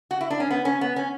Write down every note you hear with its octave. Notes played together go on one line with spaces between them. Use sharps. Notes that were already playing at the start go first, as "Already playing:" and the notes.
F#4
E4
D4
C#4
B3
C#4
B3
C#4